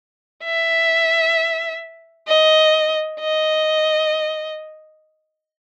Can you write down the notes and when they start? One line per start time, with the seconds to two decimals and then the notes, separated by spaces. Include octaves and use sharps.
0.44 E5
2.28 D#5
3.20 D#5